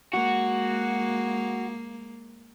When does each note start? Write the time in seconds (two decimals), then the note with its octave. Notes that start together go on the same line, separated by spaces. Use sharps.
0.13 G#3 A#3 F#4